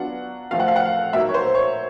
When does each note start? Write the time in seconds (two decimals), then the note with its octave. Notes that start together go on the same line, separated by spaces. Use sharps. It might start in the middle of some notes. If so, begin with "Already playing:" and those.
Already playing: F#3 B3 D4 F4 F#5
0.51 F3 A3 C4 F4 F5
0.60 F#5
0.68 F5
0.76 F#5
0.85 F5
1.13 A#2 F#3 A#3 D#4 E5
1.29 C#5
1.34 C5
1.55 C#5